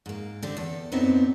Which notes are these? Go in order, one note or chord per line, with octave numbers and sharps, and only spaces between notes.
G#2 A#3
D3 G3 C4
E2 A4
F#2 A#2 D3 B3 C4 D#4